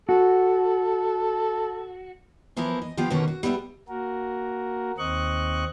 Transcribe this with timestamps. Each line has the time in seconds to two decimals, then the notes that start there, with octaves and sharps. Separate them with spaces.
0.09 F#4 A4
2.56 E3 F3 B3 E4 A#4
2.82 D#5
2.97 F3 B3 F4 G4
3.10 B2 D3 D#3 A#3 B3 C#4
3.28 F#4
3.43 G3 B3 G4 C#5 E5
3.88 A#3 F#4 A#4
4.98 D#2 C4 D#5 C#6 F#6